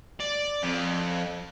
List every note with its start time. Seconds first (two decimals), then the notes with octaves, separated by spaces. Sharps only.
0.20 D5
0.63 F2